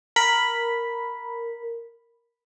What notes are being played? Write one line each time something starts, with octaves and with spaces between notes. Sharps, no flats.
A#4 B5